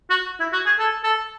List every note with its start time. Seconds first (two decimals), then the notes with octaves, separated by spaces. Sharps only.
0.10 F#4
0.40 E4
0.53 F#4
0.66 G#4
0.79 A4
1.04 A4